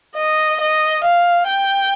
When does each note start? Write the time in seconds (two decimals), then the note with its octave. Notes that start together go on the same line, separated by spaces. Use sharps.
0.16 D#5
0.61 D#5
1.04 F5
1.48 G5